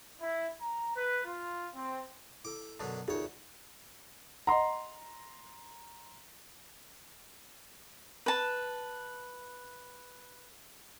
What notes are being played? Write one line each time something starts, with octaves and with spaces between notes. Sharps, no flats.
E4
A#5
B4
F4
C4
E4 A4 D6 E6
F#2 B2 D3 A5
D2 D#4 F4 G#4 A#4 C#5
D#5 F#5 A#5 C6
B4 A5